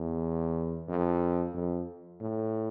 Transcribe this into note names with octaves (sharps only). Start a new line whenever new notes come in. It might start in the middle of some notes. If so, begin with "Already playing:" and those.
Already playing: E2
F2
F2
A2